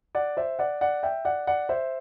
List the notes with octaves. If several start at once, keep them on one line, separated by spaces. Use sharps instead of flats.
D5 F#5
C5 E5
D5 F#5
D5 F#5
E5 G5
D5 F#5
D5 F#5
C5 E5